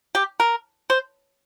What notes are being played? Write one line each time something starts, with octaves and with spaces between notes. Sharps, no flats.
G4
A#4
C5